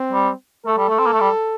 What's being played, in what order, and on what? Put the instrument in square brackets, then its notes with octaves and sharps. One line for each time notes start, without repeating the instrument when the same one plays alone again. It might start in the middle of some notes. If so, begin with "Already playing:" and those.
Already playing: [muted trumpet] C4
[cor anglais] G3
[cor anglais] A3 [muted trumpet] A4
[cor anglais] G3
A3
C4
A#3
A3
G3